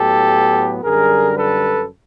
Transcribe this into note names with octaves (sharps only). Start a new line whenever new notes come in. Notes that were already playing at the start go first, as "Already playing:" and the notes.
Already playing: A2 F#3 B3 G4 A4
F#2 D3 G3 G#4 A#4
A4 B4